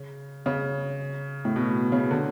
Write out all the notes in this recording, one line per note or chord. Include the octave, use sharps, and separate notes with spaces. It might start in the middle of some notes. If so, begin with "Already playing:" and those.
Already playing: C#3
C#3
A2
B2
C#3
D3